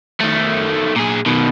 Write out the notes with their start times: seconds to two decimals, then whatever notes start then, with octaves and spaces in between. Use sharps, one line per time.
0.21 D#3 A3
0.96 A#2 G#4
1.26 B2 D#3